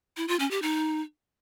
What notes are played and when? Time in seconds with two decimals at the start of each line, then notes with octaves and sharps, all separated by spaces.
0.17 E4
0.28 F4
0.40 C#4
0.51 G4
0.62 D#4